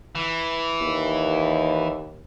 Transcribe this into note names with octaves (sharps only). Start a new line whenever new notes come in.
E3
D#2